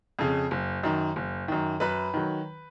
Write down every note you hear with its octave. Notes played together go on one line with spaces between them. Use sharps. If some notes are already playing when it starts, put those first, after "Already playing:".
F2 C#3
F#1
F#2 D#3
F#1
F#2 D#3
F#2 B4 B5
D#3 F#3